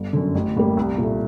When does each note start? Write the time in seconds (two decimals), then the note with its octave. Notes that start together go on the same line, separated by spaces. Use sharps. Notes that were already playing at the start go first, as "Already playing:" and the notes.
Already playing: G1
0.13 F#2 D3
0.35 A1
0.56 A2 G3 A#3
0.77 C2
0.98 A#2 A3